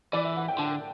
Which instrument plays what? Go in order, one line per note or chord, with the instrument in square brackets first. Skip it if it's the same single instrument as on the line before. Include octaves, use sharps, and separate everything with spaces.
[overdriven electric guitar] E3 [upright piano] D5
[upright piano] E5
F#5
G5
[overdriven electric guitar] D3 [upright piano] A5